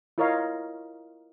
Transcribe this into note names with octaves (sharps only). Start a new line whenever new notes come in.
E4 F4 A#4 C#5 D#5 F5